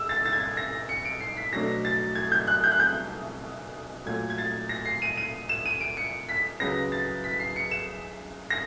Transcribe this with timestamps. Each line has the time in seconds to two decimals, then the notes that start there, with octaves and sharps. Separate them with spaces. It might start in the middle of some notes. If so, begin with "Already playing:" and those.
Already playing: G#2 E6
0.09 A6
0.26 A6
0.33 G#6
0.40 A6
0.57 A#6
0.89 C#7
1.05 D7
1.20 C7
1.37 B6
1.53 B2 F#3 A3 D4 A#6
1.85 A6
2.15 G#6
2.32 G6
2.47 F#6
2.64 G6
2.72 F#6
2.80 G6
4.06 A#2 F#3 A3 G#6
4.30 G#6
4.38 A6
4.69 A#6
4.85 C7
5.02 D#7
5.17 D#7
5.49 E7
5.66 D#7
5.81 D7
5.97 C#7
6.29 B6
6.60 C#2 C#3 F#3 B3 A#6
6.92 A6
7.24 B6
7.40 C7
7.56 C#7
7.71 E7
8.50 A#6